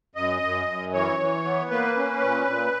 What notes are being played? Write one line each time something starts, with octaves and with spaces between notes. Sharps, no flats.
F#2 D#5
F#2
F#2
E3 C#5
E3
B3
A#3 B4
C#4
A#2
A#2